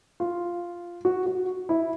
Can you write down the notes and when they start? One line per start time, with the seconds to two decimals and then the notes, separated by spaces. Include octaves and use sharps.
0.20 F4
1.05 F#4
1.26 F#4
1.69 E4